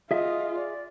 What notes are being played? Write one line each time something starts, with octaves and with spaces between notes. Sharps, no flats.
F4 G#4 D#5 E5
D5